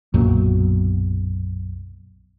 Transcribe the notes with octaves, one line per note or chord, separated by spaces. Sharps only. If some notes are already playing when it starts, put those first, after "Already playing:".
B1 F#2 A#2 F#3